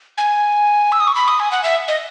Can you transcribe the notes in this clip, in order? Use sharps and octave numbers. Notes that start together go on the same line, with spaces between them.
G#5
E6
D#6
C#6
B5
D#6
G#5
F#5
E5
D#5